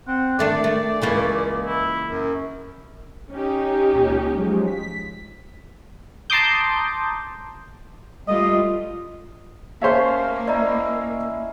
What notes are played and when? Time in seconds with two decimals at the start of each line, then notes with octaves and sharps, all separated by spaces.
0.08 C4 F#5
0.39 D3 D#3 A3 D4 D5
0.64 A3
1.02 C#2 C#3 E3 A#3
1.66 E4
2.05 F#2
3.31 C#4 D#4 G4
3.92 C#2 A#2
4.33 F3 F#3 G#3
4.67 B6
6.30 A5 A#5 C6 D6 D#6 G6
8.28 G3 A3 F4 D#5
9.82 A#3 C#4 C5 C#5 E5 F5 A5
10.47 E4 D5 D#5 A#5